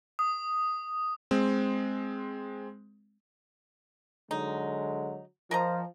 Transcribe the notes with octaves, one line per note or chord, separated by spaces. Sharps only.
D#6
G#3 C4
D3 F#3 G#3 D#4
F3 A#4 D#5 A#5